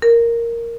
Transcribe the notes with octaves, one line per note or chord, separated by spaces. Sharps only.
A#4